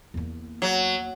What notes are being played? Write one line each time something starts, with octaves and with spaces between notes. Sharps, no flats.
E2 A#3
F#3